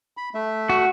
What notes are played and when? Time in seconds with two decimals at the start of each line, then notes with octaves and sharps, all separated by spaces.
0.17 B5
0.35 A3 E5
0.69 F#4